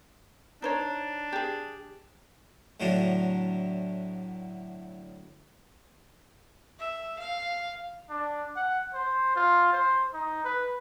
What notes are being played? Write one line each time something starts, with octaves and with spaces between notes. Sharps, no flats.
D4 D#4 C5 C#5
G4 G#4
A2 D3 F#3 D4
E5
F5
D4
F#5
C5
F4
C5
D#4
B4